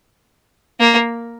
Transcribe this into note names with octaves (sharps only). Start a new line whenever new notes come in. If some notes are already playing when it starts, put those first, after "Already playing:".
A#3